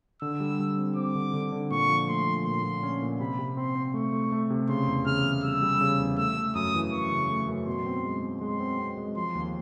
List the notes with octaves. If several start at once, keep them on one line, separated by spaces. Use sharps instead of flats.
D3 E6
G3
G3
C4
C4 D6
D3
D3
D3
A#2 C#6
F3
A3 C6
F3
A#2 C6
A#2
C#4
A#2
C3 B5
C3
C4 C6
C4
A3 C#6
A3
A3
C3
C#3 C6
E2
C#3 F6
E2
G3 E6
G3
C#3
E2
A3 E6
A3
F#2 D#6
E3
F#2 C#6
C#3
A3
F#2
B2 C6
C4
G#3
C4
G#3 C6
C4
C4
G#3
F3 C6
D#2